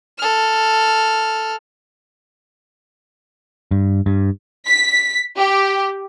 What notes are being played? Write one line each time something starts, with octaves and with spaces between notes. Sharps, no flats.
A4 F6
G2
G2
B6
G4